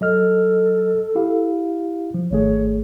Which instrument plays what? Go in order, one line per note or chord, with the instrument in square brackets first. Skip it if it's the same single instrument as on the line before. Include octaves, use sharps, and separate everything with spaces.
[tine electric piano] F#3 D#5 F6 [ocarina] A4
[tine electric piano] E4 G4 F5
F3
[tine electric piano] G#1 A3 G#4 [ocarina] C#5